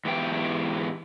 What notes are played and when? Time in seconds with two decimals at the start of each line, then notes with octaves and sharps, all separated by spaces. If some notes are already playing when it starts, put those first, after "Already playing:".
0.05 G#2 E3 B3 G4 G5